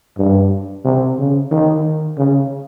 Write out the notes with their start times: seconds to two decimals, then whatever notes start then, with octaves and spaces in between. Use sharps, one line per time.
0.18 G2
0.84 C3
1.18 C#3
1.51 D#3
2.18 C#3